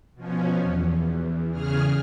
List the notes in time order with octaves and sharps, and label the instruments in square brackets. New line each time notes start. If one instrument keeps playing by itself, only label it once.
[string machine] B2 F3 C#4
E2
E2 C#3 G#4 F6